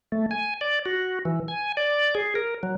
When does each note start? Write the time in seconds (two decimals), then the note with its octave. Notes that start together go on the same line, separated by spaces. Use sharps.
0.12 A3
0.31 G#5
0.61 D5
0.86 F#4
1.25 E3
1.48 G#5
1.77 D5
2.15 G#4
2.35 A#4
2.63 F#3